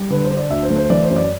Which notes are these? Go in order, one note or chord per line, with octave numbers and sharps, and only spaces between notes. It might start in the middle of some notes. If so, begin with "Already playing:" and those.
Already playing: G3
D3 B4
C5
D4
D5
D2 E5
C5
A3
C5
E3 D5
C5
F#2
D5